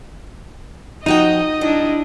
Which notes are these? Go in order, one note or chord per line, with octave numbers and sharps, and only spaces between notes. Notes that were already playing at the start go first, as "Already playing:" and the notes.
F3 D#4 F#4 D#5 G5
G3 D4 E4